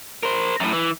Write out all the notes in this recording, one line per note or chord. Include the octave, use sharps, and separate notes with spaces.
A#4 C5
F#2 A2
E3